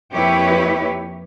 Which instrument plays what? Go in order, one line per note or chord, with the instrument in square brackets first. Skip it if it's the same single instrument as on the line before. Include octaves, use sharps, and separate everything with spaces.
[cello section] F2 A#3 E4 G4 B4 C#5